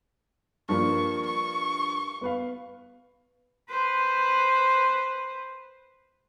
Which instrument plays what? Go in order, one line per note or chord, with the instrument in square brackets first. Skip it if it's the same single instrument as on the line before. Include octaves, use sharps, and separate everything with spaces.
[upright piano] G2 F3 A#3 [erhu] C#6
[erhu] C#6
[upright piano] B3 B4 F5
[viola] B4 C5